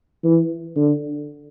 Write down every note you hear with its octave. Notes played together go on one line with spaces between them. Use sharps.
E3
D3